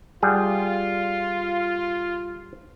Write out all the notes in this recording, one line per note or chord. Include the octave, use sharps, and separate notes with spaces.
G3 F4 G#4 F#5